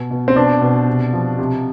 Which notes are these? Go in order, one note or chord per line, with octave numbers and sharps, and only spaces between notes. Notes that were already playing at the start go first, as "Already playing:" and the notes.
Already playing: B2
B2
C4
B2 D4
B2
C3
F3
C3